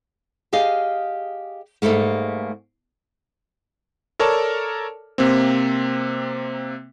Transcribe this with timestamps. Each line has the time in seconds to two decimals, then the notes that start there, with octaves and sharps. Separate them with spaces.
0.53 G4 G#4 D#5 F5
1.82 G#2 C#3 G3 A3 A#3
4.19 A4 A#4 C#5 D5 A5
5.18 C3 A#3 C4